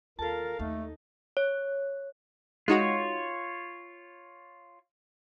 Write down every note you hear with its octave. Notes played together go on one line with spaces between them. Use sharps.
D#2 F4 A4 A#4 F5 A5
D#2 A3 D#4
C#5
G#3 D#4 F4 F#4 C#5